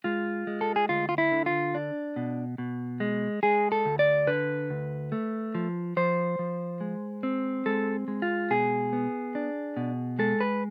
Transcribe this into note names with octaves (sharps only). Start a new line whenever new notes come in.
G#3 F4
G#3
A4
G#4
D2 F4
F4
E4
D3
F4
D4
B2
B2
G#3
G#3 G#4
A4
D2
D5
D3 B4
D2
A3
F3
F3 C5
F3
G#3
C4
G#3 A4
G#3
F4
B2 G#4
B3
D4
B2
G#3 A4
B4